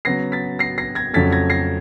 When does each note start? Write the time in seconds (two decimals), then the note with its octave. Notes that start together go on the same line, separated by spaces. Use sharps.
0.05 C#3 F#3 B3 A#6 C7
0.32 A6 B6
0.59 A#6 C7
0.78 A#6 C7
0.95 G#6 A#6
1.13 F2 C#3 F#3 A3 A6 B6
1.32 G#6 A#6
1.50 A#6 C7